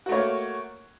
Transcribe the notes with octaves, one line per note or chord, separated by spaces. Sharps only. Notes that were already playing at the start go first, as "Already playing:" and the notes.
A3 A#3 F#4 C#5